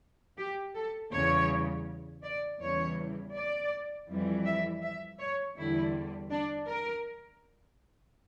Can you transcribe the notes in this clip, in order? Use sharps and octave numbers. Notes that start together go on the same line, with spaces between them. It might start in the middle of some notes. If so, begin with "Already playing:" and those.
G4
A4
E2 C#3 G3 C#5
D5
E2 C#3 E3 G3 C#5
D5
F2 E3 G3
E5
E5
C#5
E2 D3 G3 E4
D4
A#4